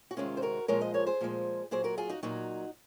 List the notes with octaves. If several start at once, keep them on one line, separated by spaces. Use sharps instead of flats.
F#4
C3 D#3 G#3 C#4 F4
C5
F#4 A#4
A#2 F3 G#3 A#4 C#5
C5 D#5
A#4 C#5
G#4 C5
A#2 F3 G#3
A#2 F#3 G#4 C5
F#4 A#4
F4 G#4
D#4 F#4
A#2 F#3 D#4 F#4